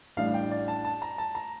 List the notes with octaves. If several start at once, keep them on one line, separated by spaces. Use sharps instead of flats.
A1 A2 G3 D4 F5
G5
D5
A5
A5
A#5
A5
A#5